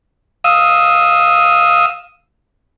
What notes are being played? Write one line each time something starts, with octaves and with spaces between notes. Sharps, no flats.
F5 D#6 E6